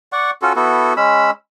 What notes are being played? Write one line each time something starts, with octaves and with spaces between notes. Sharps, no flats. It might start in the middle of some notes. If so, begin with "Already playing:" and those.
D5 F#5 C#6
C#4 F4 F#4 A4
B3 E4 F#4 A4
G#3 C#4 B5 E6